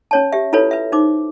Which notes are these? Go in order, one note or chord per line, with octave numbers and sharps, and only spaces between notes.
C#4 C#5 A5
G4 E5
E4 F4 A4 B4 C#5
B4 E5
D#4 C5 D6